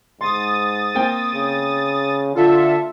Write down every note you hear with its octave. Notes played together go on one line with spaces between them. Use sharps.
G#2 C6 D#6 A6
A#3 C4 G5
C#3
D3 F4 A4 E5